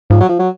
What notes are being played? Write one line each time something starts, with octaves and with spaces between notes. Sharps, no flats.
G#2 F3
F#3
F3
F#3